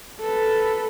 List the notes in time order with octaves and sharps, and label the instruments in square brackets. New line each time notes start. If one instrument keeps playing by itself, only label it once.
[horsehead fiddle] A4 B4